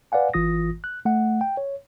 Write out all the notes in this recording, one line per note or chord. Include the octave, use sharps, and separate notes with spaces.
B4 D5 F5 F#5 G#5
G#1 E3 F4 D#6 A#6
F#6
A3 F#5
G5
C#5